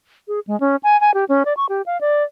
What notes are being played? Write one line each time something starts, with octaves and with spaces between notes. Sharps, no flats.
G#4
G#3
C#4
G#5
G#5
G4
C#4
D5
C#6
G4
F5
D5